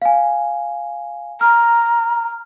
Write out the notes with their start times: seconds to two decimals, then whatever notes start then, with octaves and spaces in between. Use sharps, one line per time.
0.02 F5 G#5
1.41 A#5 F6